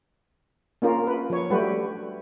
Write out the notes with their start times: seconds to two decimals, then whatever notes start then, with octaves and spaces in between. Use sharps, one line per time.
0.82 A#3 C#4 F4 A#4
1.07 B4
1.30 F3 C#5
1.50 F#3 G3 A3 F#4 G4 B4